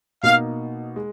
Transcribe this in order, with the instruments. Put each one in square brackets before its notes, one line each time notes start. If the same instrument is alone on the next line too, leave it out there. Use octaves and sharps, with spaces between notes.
[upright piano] B2 A#3 D#4 [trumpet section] F5
[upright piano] G#3